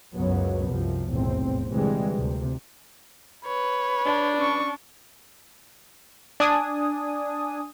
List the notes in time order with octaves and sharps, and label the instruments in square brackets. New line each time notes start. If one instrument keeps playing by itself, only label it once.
[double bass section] C#2 F#2 C#3 F#3 B3
C2 F#2 C3 F3
F1 B1 E2 A2 C4
D2 C3 E3 G3 G#3
D2 C3
[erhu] B4 [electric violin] C#5
[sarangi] D4
[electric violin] C#4 C#6
[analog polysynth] D4 G#5 D#6